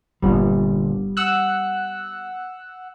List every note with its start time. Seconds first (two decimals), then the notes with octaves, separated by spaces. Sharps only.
0.22 G1 A#2 G3 B3
1.17 F#5 E6 F#6